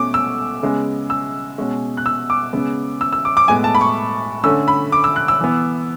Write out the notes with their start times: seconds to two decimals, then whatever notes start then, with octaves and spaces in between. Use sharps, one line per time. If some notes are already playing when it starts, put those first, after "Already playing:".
Already playing: B2 A3 C#4 D6
0.14 E6
0.63 C#3 G#3 B3
1.10 E6
1.58 B2 G#3 C#4
1.97 F#6
2.06 E6
2.30 D6
2.53 C#3 G#3 B3
3.01 E6
3.13 E6
3.25 D6
3.37 D6
3.48 A2 G#3 B3 G#5
3.64 A5
3.75 B5
3.81 C#6
4.44 D3 A3 C#4 E6
4.68 B5
4.92 D6
5.04 E6
5.16 F#6
5.28 E6
5.40 E3 B3